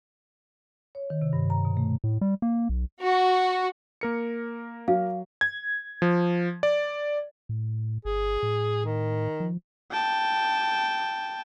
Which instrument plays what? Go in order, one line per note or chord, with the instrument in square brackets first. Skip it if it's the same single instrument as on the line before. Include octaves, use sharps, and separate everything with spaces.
[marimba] C#5
D#3
C3
G2
A#5
B2
A3
[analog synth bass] A2
G3
A#3
B1
[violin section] F#4
[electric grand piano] A#3 A#4 C#7
[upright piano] F#3 [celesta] F5
[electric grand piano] G#6
F3
D5
[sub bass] A2
[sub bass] G1 [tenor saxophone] G#4
[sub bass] A2
[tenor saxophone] D#3
[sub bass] F3
[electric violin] G5 A5